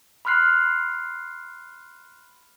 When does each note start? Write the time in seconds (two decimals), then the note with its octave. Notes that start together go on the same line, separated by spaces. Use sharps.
0.25 B5 C6 F6 F#6 C7